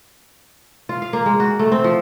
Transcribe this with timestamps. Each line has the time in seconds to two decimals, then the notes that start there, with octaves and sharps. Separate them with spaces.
0.89 F4
1.02 F5
1.13 A#3
1.26 G#3
1.40 F#4
1.59 A3
1.72 C4
1.84 F3